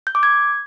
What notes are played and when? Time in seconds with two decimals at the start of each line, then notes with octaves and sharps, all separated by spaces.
0.07 G6
0.15 D6
0.23 G#6